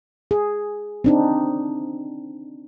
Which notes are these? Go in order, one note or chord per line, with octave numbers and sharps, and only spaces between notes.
G#4
C4 D4 D#4